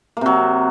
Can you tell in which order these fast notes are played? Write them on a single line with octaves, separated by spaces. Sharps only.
A#3 C3 F#3